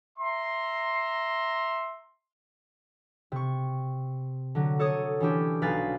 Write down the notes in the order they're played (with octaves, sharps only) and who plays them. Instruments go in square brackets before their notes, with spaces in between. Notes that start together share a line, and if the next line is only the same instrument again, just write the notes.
[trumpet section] E5 A#5 C6
[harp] C3 C#6
D3 F#3
A4 C#5 D#6
E3 C#4 D4 G4
B1 B4 F5 G#5 A6